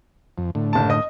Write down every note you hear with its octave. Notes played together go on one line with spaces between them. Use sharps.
F2
A2 D3
F#1 A5
D#5 D#6